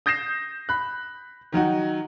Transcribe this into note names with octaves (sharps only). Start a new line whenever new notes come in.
D#6 G6 A#6 C7 E7
B5 F#6
D#3 F#3 D#4 F#4